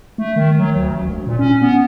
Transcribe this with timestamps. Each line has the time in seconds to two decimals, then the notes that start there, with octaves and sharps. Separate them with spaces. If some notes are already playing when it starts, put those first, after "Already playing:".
0.18 A3
0.36 D#3
0.58 F#3
0.76 D2
0.91 A1
1.04 E1
1.26 A#2
1.39 C#4
1.62 B3